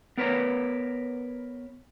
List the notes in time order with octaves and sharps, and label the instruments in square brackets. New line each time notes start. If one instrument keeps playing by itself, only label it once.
[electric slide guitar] B3 A#4 B4 C#5 A#5